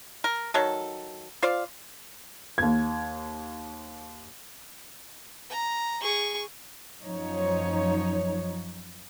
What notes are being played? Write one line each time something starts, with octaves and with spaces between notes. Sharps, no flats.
A#4
D#3 F#3 A4
F4 C5 D5 F5
D#2 G#6
A#5
G#4 C#6
F#2 F3 D#4 C#5